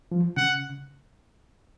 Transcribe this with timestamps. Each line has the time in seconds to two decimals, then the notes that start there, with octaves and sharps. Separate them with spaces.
0.12 F3
0.37 C#3 F#5